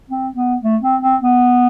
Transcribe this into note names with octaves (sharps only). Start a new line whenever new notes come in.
C4
B3
A3
C4
C4
B3